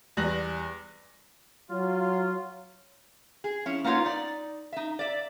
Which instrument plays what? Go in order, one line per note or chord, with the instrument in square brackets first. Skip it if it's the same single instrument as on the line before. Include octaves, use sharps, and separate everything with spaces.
[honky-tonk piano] E2 G3 F#6 A#6 F#7
[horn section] F#3 F4
[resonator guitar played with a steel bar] G#4
F3 C#4 E4
A#3 B3 D#4 F4 C#5
D#4 D5
D#4 E5
D5 E5